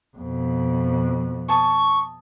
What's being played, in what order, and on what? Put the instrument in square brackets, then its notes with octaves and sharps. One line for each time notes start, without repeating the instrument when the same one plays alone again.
[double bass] F2 B2
[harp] G#5 A5 D#6 [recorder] C#6